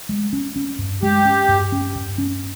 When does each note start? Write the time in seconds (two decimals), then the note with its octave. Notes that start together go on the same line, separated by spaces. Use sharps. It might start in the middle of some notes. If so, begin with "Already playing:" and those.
0.09 G#3
0.33 C#4
0.56 C#4
0.79 G2
1.02 G#3 G4
1.25 C#4
1.49 G2
1.72 C#4
1.96 G2
2.18 C#4